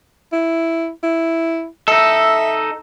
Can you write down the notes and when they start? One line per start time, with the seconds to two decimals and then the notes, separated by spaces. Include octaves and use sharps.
0.32 E4
1.03 E4
1.88 D#4 A4 E5